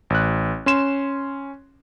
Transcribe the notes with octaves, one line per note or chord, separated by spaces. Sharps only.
A1 F#6
C#4 C6 E7